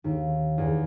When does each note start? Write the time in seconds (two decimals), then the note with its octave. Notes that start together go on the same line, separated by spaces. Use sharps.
0.04 D#2
0.58 E2